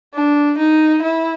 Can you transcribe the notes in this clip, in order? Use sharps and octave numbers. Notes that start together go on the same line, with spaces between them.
D4
D#4
E4